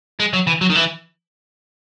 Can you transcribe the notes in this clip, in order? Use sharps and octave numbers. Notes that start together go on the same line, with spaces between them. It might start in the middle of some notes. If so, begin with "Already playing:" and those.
G#3
F#3
E3
F#3
D#3
E3